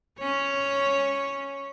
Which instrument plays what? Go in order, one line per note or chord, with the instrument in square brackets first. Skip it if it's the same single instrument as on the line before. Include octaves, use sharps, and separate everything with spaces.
[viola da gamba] C#4 C#5